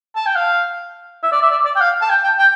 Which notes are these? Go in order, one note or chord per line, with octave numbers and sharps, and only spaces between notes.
A5
G5
F5
E5
D5
E5
D5
D5
G5
F5
A5
G5
G5
G5